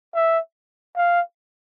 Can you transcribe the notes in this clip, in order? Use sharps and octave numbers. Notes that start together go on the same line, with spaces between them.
E5
F5